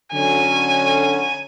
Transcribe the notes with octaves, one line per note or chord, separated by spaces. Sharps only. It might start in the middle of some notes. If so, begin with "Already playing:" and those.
D3 F#3 C#4 G#5